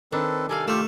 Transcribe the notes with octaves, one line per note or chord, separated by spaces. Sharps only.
D#3 C4 D4 A4 B4
C3 G3 A4 F5 G#5
A3 F4 G4 A4